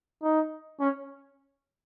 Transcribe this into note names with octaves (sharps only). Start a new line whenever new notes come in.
D#4
C#4